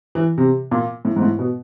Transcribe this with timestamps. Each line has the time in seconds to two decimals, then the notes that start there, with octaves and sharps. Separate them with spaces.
0.15 E3
0.38 C3
0.71 A#2
1.05 A2
1.16 G#2
1.22 A2
1.39 B2